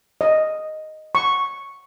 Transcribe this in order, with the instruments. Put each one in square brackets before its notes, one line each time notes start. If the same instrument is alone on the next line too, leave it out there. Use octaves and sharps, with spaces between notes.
[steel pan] D#5
C#6